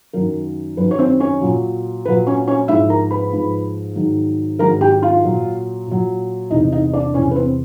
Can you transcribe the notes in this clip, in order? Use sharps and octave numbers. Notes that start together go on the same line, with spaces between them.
F#2 D#3 F#3 A#4
F#2 D#3 F#3 B4
C#5
C4 C5
C#4 C#5
A#2 F#3
A#2 F#3 B4
C#4 C#5
C#4 C#5
G#2 F3 E4 E5
A#4 A#5
B4 B5
G#2 F3
G#2 D#3 F#3
G#2 D#3 F#3 A#4 A#5
G4 G5
F4 F5
A#2 F#3
A#2 F#3
E2 C3 E3 D#4 D#5
D#4 D#5
D4 D5
E2 C3 E3 C#4 C#5
B4
C4 C5